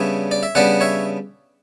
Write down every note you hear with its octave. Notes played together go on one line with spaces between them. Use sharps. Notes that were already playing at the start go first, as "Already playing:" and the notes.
Already playing: C#3 G3 B3 D4 C#5 E5
D5
E5
C#3 G3 B3 D4 D5 F#5
C#5 E5